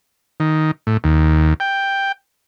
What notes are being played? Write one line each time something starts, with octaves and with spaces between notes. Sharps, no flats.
D#3
A2
D#2
G5